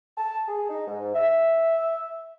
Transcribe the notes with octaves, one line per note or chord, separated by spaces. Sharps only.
A5
G#4
D#4
G#2
E5